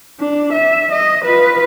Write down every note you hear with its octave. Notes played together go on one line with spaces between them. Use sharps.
D4
E5
D#5
F4 B4